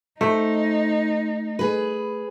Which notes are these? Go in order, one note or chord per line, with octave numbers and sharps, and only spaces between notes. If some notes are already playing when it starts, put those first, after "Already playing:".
A3 D#4 C5
G#4 B4